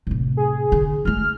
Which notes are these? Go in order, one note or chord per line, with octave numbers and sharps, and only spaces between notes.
A2 C3
G#4
D3
G#3 A3 F6